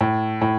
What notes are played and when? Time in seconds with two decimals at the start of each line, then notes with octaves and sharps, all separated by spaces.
0.01 A2
0.42 A2